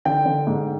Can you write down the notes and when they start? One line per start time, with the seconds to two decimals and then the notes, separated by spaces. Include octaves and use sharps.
0.05 D3 G5
0.26 D3
0.47 G#2